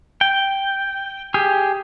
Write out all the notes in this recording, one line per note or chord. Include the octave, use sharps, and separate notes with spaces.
G5
G4 G#4